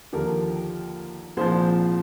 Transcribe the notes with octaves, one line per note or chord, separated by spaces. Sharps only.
D#2 D3 F3 G4 A#4
C2 A#2 F3 G#4 C5